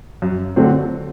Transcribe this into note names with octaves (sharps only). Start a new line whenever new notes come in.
F#2
D3 F#3 A3 C4